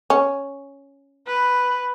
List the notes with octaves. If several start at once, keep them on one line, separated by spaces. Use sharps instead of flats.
C#4
B4